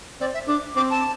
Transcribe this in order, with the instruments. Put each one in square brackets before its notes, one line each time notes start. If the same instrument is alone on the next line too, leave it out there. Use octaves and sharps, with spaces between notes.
[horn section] C4 [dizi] D5
[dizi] E5
[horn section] D4 [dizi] D6
[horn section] C4 [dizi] D6
[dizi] A5